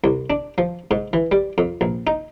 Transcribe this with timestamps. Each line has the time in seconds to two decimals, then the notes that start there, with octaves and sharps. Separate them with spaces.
0.04 C2
0.30 D4
0.58 F3
0.91 G#2
1.13 E3
1.32 G3
1.58 F2
1.81 A#1
2.07 D#4